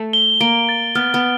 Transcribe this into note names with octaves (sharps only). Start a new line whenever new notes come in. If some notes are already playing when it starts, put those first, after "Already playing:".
Already playing: A3
G7
A#3 D7
A6
B3 F6
B3